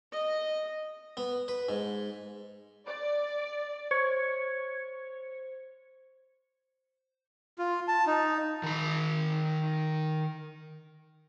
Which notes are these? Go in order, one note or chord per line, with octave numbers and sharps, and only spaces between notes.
D#5
B3
B4
G#2
D5
C5 C#5
F4
A5
D#4
D#3 B5